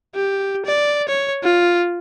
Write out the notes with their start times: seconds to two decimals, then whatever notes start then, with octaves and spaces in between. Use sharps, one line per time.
0.15 G4
0.65 D5
1.08 C#5
1.43 F4